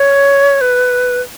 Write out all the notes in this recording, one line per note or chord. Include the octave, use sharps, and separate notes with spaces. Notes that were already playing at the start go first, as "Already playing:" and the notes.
Already playing: C#5
B4